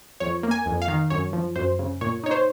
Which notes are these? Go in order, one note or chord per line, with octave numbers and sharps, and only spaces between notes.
F2 C#5
A#3
G#5
F2
F5
D#3
F#2 C#5
F3
F#2 C5
C#3
A#2 C#5
D#4 C#5
C5